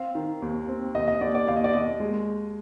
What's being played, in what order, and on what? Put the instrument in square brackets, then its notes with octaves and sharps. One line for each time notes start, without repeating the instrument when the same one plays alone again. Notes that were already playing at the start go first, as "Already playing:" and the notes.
Already playing: [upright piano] C4 [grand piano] F5
[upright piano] D#3
D#2
C4
[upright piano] D#2 [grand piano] D#5
[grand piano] D#5
[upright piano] D#2 [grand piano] D5
[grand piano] D5
[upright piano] D#2 [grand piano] F5
[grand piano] D#5
D5
[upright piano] D#2 [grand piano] D#5
[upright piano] G#3